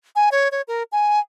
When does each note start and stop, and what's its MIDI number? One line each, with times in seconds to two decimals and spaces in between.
0.16 0.29 80
0.31 0.48 73
0.52 0.61 73
0.68 0.83 70
0.92 1.19 80